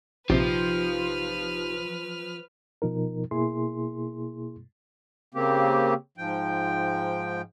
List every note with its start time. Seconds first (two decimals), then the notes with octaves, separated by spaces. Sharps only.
0.30 A#1 C3 F3 D#4 F4 G4 B4 F6
2.82 B2 F3 D#4 A#4
3.31 B2 A#3 E4 G#4 C6
5.34 C#3 A#3 C4 G4
6.18 G#2 F3 G5